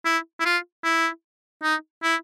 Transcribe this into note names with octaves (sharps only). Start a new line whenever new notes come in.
E4
E4
F4
E4
D#4
E4